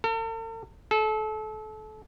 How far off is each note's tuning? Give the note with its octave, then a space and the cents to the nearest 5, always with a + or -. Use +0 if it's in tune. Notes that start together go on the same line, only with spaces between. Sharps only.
A4 +45
A4 -30